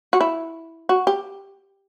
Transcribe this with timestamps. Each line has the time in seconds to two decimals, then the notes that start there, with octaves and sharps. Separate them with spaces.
0.13 F#4
0.21 E4
0.89 F#4
1.07 G4